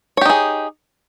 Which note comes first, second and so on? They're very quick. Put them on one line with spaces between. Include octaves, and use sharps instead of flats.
C#5 G4 D#4 G#4